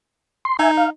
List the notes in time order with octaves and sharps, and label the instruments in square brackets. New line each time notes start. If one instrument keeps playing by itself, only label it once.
[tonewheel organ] C6
[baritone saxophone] D#4 [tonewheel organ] E5 G#5
[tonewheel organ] F5